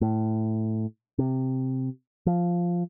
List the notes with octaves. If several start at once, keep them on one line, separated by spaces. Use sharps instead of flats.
A2
C3
F3